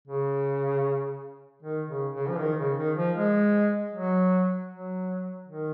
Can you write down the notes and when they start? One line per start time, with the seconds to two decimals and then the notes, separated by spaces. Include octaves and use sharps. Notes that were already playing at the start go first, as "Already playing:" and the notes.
0.07 C#3
1.62 D#3
1.88 C#3
2.13 C#3
2.28 F3
2.39 D#3
2.58 C#3
2.77 D#3
2.97 F3
3.15 G#3
3.93 F#3
4.71 F#3
5.47 D#3